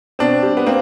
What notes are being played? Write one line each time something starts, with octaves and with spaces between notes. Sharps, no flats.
B2 C4 D4
G3
B3
A#3 C4